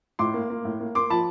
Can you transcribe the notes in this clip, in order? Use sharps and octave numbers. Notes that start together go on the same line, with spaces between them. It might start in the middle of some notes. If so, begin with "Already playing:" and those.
A2 C6 D6
A#3
A#3
A2
A#3
A#3 C6 D6
F3 A5 B5